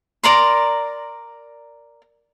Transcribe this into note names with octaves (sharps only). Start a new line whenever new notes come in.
A#4 D5 A#5 C6